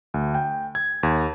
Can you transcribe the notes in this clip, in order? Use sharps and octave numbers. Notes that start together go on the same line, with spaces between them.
D2
G5
G#6
D#2